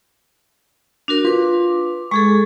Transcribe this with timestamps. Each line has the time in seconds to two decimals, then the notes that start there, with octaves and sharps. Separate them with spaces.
1.08 D4 F#4 A#4
1.25 F4 B4 D6
2.11 G#3 G#4 A4 C#6